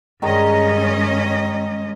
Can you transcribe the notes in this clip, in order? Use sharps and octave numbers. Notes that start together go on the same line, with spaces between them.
G2 D#3 G#3 C#4 D#5